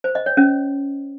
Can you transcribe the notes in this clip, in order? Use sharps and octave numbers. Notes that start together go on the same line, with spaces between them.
C5
D#5
C#5
C#4